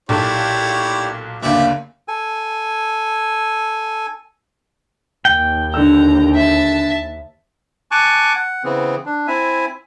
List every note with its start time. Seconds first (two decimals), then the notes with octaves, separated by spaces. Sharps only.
0.09 B1 A#2 E4 G4 A4 C#5 D5
1.43 F#1 D2 A#3 G4 D5 E5
2.08 A4 G#5
5.25 D#2 G5
5.74 D3 A#5 E6
6.34 E5 A5
7.91 G#5 A5 C#6 D6 F#6
8.36 F#5
8.64 C#3 E3 B3 C4
9.06 D4
9.27 C4 E4 E5 G#5